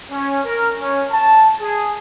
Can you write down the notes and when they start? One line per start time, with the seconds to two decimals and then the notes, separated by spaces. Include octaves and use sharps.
0.11 C#4
0.45 A#4
0.79 C#4
1.10 A5
1.62 G#4